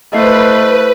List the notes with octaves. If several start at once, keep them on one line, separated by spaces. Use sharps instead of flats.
A3 E4 B4 C5 D#5 F5 C7